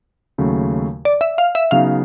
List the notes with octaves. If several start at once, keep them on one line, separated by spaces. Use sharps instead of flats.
D#2 C#3 F#3 A3
D5
E5
F5
E5
C#3 F#3 B3 D#4 F5